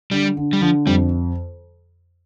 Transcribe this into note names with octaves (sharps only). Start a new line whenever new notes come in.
D3 G3
D3
G3
D3 F3
F2 G3